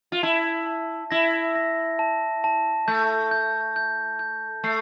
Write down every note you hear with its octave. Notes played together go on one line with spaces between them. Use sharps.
F4
E4 A5
A5
E4 A#6
A#6
A5
A5
A3 G6
G6
G6
G6
A3 C7